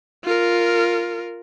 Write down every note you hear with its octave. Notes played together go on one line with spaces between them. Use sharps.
F4 A#4